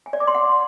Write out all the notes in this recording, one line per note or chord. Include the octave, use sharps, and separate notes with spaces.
G#5
D5
D6
C6
F#5